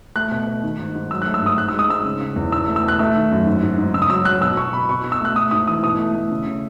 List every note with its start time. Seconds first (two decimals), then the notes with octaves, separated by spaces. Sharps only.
0.16 A3 F#6
0.31 B2
0.47 B2
0.63 D#3
0.79 G#2
0.95 G#2
1.11 F#3 E6
1.22 A3 F#6
1.34 E6
1.42 G#2 D#6
1.58 G#2 F#6
1.69 E6
1.74 G#3
1.79 D#6
1.89 G#2 E6
2.05 C#3
2.21 C#3
2.36 E2
2.52 B2 E6
2.68 A3
2.76 E6
2.83 B2
2.88 F#6
2.99 A3 E6
3.16 D#3
3.31 F#2
3.47 G#2
3.62 G#2
3.78 G#2
3.94 C#3 E6
4.02 D#6
4.10 F#3 E6
4.25 F#3 F#6
4.41 B2 E6
4.57 B2 C#6
4.73 B2 B5
4.89 B2 C#6
5.04 B2
5.12 E6
5.21 A3 F#6
5.36 A3 D#6
5.51 G#2 D#6
5.67 E3 D#6
5.83 B2 D#6
5.99 A3
6.15 A3
6.30 C#3
6.46 C#3